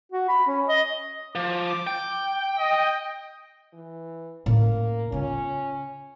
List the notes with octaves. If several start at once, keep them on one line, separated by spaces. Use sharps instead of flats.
F#4
B5
C#4
D#5
F3 D6
G5
D#5
E3
A2 A#3 C#4
C#3 C#4 F4